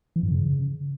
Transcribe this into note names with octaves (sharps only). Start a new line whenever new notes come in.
E3
G2
C#3